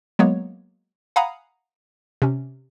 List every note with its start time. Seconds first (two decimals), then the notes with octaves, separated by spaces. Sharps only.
0.19 F#3 G#3 A#3 B3 C#5
1.16 F5 F#5 G#5 A#5 B5 D#6
2.22 C3 C#4